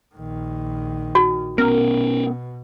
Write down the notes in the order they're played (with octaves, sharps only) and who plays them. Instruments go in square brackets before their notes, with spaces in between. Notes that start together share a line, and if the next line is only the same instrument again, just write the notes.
[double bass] A#1 D#3
[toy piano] F#4
[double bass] B2 [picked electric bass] B3 C#4 [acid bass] A#4